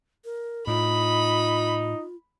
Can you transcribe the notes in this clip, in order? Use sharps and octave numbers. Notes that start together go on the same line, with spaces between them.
A#4
A2 D#4 F4 B5